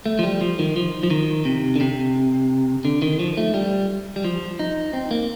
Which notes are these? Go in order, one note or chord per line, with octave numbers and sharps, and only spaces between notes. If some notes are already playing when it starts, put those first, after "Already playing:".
A3
F3
G3
F3
D#3
F3
F3
D#3
C3
D3
C3
D3
D#3
F3
A3
G3
G3
F3
D#4
C4
A#3